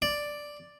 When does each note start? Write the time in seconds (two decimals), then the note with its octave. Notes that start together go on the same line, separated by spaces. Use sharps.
0.02 D5